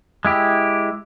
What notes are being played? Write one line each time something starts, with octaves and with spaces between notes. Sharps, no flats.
G#3 E4 G4